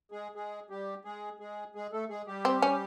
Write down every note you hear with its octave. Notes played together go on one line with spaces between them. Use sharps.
G#3 G#4
G#3 G#4
G3 G4
G#3 G#4
G#3 G#4
G#3 G#4
A3 A4
G#3 G#4
G3 G4
C4
C#4